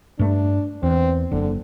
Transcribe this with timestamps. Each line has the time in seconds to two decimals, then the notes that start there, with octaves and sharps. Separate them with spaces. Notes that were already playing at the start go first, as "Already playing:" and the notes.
0.19 G2 A3 D4
0.83 E2 C4
1.32 F#1 D3